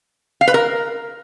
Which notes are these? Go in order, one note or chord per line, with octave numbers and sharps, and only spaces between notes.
F5
B4
A#4